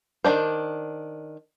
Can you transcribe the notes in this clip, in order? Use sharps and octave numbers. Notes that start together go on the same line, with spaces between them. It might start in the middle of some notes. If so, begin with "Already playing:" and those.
D#3 G#3 D4 C5